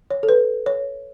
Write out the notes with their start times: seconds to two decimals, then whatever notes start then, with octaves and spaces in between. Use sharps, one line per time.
0.11 C#5
0.23 A4
0.29 B4
0.66 C#5